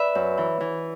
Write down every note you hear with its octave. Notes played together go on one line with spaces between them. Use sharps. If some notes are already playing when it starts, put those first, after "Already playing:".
Already playing: B4 D5 E5
F#2
E3
E3